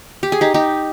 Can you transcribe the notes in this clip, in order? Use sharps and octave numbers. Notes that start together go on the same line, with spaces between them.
G4
G#4
D#4 G4
D#4 G4